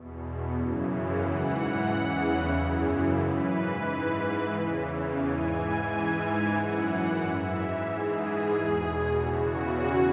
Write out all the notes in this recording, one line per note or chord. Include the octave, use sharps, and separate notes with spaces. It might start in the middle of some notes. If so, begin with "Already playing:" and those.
Already playing: E2 B2
F#2 C#3 E3
G#2 E3 F#5
E2 C#3 E3
F#2 C#3 E3
G#2 E3 B4
G#2 E3
E2 C#3 E3
G#2 E3 G#5
G#2 E3
F#2 E3 F#5
F#5
G#2 E3 E5
G#2 E3 G#4
E2 B2
E2 C#3 E3 F#4